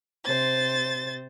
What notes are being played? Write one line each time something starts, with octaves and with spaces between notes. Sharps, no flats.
C3 C5 A6